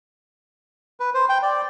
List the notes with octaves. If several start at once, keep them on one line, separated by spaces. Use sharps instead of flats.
B4
C5
G5
D5